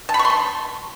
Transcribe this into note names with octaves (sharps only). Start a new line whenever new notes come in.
A5
B5
C#6
C6
A5